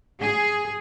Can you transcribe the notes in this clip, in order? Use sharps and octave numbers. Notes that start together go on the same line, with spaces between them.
G#4